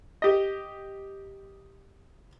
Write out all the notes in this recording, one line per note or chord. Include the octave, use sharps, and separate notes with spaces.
G4 D#5